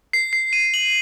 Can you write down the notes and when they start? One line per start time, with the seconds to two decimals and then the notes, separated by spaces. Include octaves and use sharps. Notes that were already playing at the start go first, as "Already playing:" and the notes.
0.13 C7
0.33 C7
0.53 D#7
0.74 F#7